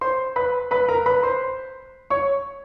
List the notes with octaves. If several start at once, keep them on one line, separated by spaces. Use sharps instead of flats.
C5 C6
B4 B5
B4 B5
A#4 A#5
B4 B5
C5 C6
C#5 C#6